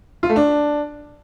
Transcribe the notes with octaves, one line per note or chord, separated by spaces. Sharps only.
F4
A3
D4